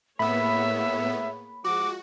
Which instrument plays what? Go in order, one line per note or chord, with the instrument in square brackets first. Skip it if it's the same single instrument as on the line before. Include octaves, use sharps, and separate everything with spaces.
[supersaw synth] A2 B3 [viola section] A#3 G#4 C#5 [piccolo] E5 [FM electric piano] B5
[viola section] F3 G#3 [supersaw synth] F#4 [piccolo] D6